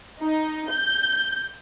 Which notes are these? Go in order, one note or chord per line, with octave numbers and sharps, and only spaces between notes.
D#4
G6